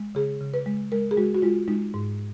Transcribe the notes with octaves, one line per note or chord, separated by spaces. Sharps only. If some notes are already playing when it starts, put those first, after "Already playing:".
Already playing: G#3
C#3 G#4
C#3
B4
G#3
G#3 A#4
G#4
G#3 F#4
F#4
G#3 F4
G#3 D#4
G#2